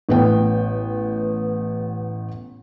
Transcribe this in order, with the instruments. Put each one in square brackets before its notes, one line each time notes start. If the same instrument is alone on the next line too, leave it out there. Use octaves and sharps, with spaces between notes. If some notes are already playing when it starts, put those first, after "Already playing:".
[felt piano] A1 B3 G5